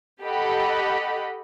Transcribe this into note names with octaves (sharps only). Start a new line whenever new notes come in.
G4 A4 D#5 F#5 B5